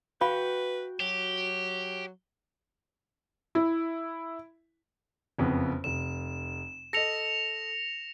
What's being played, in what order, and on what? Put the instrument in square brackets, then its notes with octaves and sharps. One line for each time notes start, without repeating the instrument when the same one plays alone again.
[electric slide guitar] F#4 G5 [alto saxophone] B4 [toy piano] F5 B5
[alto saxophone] F#3 [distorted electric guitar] G4
[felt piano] E4
[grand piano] F#1 F2 B3
[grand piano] F1 [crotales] E7
[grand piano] A4 D#5 [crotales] A#6 C#7 F7